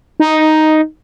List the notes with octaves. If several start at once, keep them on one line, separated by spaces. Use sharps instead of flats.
D#4